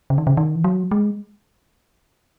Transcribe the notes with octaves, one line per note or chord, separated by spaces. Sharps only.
C#3
D#3
C#3
D#3
E3
F#3
G#3